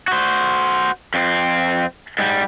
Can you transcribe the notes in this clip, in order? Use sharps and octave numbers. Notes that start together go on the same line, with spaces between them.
F#4 C5
F2 C4
G#2 G3